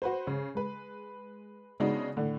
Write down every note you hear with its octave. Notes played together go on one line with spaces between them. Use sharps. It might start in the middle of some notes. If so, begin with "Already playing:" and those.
F#4 B4 C5
C#3
G#3 B4
C#3 G#3 B3 D4 D#4 F#4
A2 D3